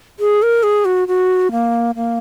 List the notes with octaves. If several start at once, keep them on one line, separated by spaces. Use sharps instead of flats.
G#4
A#4
G#4
F#4
F#4
A#3
A#3